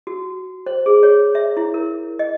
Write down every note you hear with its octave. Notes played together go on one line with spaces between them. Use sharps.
F#4
C5
G#4
C#5
E5
E4
A#4
D#5